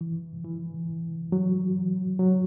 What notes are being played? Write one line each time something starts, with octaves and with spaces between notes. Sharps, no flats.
E3
E3
F#3
F#3